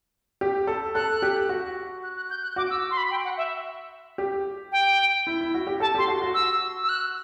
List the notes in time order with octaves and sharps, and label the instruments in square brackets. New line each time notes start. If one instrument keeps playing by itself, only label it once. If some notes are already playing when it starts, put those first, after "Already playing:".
[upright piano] G4
A4
[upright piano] A4 [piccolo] F#6
[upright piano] G4
F#4
[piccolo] F#6
F#6
G6
F#6
[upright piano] F#4 [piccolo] D6
[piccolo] E6
C6
B5
G5
F#5
E5
[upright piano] G4
[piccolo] G5
[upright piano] E4
E4
F#4
G4
[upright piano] A4 [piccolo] A5
[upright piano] G4 [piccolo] C6
[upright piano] F#4
F#4
[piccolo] E6
E6
F#6